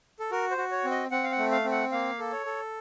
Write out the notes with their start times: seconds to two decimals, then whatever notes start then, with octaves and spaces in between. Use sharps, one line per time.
0.20 A4
0.31 F#4 A#4
0.51 C5
0.58 F#4
0.71 C#5
0.85 C4
0.91 D#5
1.11 C4 F#5
1.23 F5
1.32 F#5
1.38 A3
1.52 F5
1.65 C4
1.71 F#5
1.92 A#3 F5
2.19 A4
2.32 C#5
2.46 A4